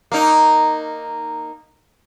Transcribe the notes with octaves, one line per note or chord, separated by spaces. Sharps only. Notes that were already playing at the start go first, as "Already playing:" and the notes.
A#3 D#4